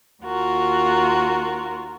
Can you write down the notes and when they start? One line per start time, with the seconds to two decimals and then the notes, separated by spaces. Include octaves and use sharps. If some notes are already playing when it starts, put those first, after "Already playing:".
0.24 D#2 F4 F#4 A#4